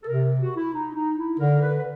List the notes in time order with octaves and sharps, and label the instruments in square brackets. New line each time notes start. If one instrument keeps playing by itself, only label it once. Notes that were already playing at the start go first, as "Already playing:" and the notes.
[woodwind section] A4
[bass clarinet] C3 [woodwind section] A#4
[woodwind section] F#4
E4
D#4
D#4
E4
[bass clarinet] D3 [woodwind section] A#4
[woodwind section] B4
B4